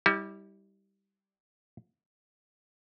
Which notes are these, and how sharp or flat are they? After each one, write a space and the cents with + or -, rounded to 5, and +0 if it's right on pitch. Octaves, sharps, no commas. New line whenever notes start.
G3 +0 E4 -40